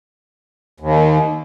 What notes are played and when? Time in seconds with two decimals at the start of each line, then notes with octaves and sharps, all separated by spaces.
0.80 D#2